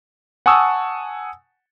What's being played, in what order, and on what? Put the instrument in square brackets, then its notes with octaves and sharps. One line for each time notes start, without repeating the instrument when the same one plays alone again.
[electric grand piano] F#5 G#5 A5 C#6 D#6 E6